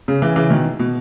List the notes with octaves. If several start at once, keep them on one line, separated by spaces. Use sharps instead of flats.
C#3
C#3 E3
C#3 E3
B2 D#3
B2